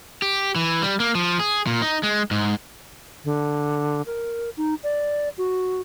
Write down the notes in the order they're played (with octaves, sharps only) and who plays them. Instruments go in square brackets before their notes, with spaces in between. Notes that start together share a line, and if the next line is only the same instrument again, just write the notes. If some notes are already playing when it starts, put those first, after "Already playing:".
[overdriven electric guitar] G4
E3
G3
A#3
F3
G#4
A#2
D#4
G#3
G#2
[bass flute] D3
A#4
D#4
D5
F#4